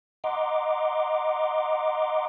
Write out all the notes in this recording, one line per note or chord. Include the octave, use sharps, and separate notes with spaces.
D#5 F#5 A#5 C6 D6